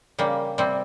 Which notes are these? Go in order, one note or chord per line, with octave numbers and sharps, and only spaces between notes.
C#3 G3 A#3
C3 G3 C4